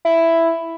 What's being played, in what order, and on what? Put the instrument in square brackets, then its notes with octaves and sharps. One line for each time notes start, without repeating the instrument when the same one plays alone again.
[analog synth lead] E4